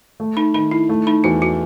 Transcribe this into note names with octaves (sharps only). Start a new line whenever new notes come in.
A3
D#4
D#3 D#4
E4
A3
D#4
E2 F#4
F#4